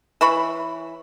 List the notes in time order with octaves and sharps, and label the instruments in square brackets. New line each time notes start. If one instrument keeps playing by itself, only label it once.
[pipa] E3 B4 C#5 B5